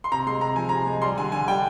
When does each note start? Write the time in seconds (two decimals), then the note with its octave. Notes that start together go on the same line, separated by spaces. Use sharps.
0.04 C6
0.12 C3 A#5
0.27 G#3 C6
0.41 C3 A#5
0.56 F3 G#5
0.69 C3 A#5
0.86 G#3
1.02 G3 C6
1.18 D3 G#5
1.32 D3 G#5
1.48 G3 G5